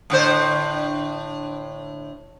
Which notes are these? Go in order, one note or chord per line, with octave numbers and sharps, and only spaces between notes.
A2 D3 C5